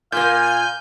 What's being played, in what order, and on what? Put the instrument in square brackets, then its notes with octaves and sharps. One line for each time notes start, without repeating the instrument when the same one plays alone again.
[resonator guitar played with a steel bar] A#2 A#3 [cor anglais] F5 [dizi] G#5 [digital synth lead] G6